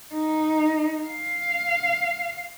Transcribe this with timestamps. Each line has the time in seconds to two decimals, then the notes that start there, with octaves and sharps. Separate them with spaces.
0.14 D#4
1.06 F5